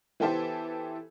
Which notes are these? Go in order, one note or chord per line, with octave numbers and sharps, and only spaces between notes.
E3 B3 G4 A4 C5 E5